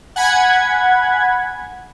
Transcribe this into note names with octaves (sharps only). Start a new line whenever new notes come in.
F#5 G#5 B5 G#6